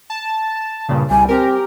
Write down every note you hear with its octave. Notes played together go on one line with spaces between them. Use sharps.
A5
G2 A#2 C#3
C2 G3 G#5
C4 G4 A#4